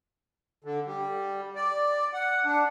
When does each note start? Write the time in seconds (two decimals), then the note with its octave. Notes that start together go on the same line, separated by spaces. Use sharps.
0.64 D3
0.86 G3
1.56 D5
2.13 F#5
2.45 D4